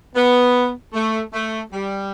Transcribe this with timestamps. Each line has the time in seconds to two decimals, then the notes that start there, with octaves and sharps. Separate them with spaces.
0.15 B3
0.93 A3
1.33 A3
1.72 G3